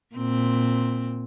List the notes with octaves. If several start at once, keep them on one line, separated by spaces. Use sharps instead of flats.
A#2 C4